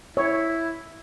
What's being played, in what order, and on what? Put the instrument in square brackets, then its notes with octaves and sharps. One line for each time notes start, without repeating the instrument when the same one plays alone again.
[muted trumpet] E4 [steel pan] C#5